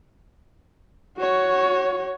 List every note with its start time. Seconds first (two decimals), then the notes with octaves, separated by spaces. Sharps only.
1.17 F#4 C#5